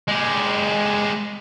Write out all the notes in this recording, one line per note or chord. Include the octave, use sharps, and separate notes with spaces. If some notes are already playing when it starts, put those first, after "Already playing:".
G#3 G4